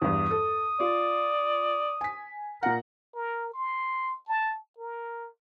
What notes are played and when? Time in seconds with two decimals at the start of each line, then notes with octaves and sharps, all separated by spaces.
0.02 E2 G2 D#6
0.31 A4
0.80 F4 D5
2.01 G#5 B6
2.63 A#2 A#4 F#5 A#5
3.15 A#4
3.53 C6
4.28 A5
4.79 A#4